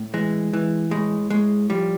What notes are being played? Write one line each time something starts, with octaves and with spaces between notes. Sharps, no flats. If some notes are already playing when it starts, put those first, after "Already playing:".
Already playing: A2
E3 G#3
E3
A2 G#3
A2 G#3
F3 G3